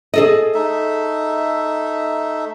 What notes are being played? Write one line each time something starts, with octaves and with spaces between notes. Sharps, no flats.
G#4 A4 D#5
A3 D#4 E5